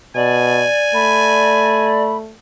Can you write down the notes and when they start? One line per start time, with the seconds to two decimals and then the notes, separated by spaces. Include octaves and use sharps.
0.16 B2 D5 G#5
0.94 A3 B5